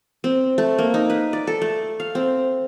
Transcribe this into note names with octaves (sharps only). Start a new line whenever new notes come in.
C4
A3
A#3
D#4
B4
D5
A4
A3
F5
C4